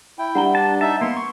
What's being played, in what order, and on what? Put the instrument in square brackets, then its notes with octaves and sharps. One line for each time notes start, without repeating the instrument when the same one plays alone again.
[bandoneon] E4 G5
[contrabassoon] G2 [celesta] F#5 A#5 G7
[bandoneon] D4 [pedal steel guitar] A5
[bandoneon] D#4 E5 [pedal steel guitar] A5
[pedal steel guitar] A#3 B3 [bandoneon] C6
[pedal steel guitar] C#6